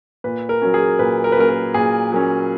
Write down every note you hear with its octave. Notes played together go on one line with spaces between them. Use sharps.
A#2 B4
A#4
F#3 A#3 C#4
G#4
A#2 B4
A#4
B4
F#3 A#3 C#4 A#4
A#4
A#2 G#4
F#3 A#3 C#4